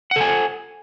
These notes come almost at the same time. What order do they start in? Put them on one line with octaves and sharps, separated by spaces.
F#5 A4 G#5